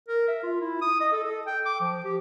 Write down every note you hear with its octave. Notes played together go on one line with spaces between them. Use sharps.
A#4
E5
F4
E4
D#6
D#5
A4
A4
G5
D6
F3
G4